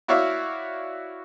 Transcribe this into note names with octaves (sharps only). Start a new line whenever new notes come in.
E4 F#4 C#5 D5 E5 F5